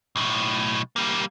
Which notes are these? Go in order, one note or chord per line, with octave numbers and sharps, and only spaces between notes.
B1 A2
G3 A#3